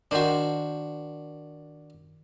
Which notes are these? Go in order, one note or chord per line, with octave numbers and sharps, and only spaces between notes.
D#3 D4 F#4 C5